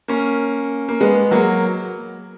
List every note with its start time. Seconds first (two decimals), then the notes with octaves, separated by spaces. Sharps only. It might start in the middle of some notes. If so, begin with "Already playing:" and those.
0.08 A#3 C#4
0.89 A#3
1.00 G#3 B3
1.31 F#3 A#3